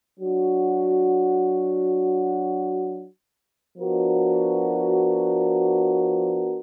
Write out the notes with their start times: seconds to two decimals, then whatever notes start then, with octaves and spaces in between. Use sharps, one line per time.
0.19 F#3 D4 F#4
3.77 F3 B3 D4 F#4 A#4